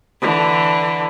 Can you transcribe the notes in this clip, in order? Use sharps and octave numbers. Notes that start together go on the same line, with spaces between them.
D3 E3